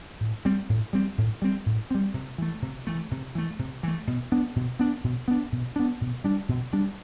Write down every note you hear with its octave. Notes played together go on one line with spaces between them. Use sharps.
A2
G3 C4
A2
G3 C4
A2
G3 C4
A2
G3 C4
C3
E3 A3
C3
E3 A3
C3
E3 A3
C3
E3 A3
B2
B3 D4
B2
B3 D4
B2
B3 D4
B2
B3 D4
B2
G3 D4
B2
G3 D4